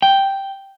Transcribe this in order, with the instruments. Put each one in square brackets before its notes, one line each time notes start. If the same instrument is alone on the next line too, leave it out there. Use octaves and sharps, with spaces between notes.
[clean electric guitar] G5